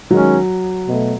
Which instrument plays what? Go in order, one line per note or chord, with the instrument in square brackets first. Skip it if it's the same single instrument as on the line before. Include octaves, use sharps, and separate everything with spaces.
[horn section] D#3 G#3 C#4 [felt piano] F#3
[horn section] B2 A3